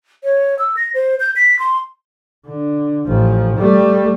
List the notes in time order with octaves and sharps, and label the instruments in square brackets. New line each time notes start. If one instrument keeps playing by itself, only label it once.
[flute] C#5
E6
A#6
C5
G6
B6
C6
[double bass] D3
A1 F3
G3 A3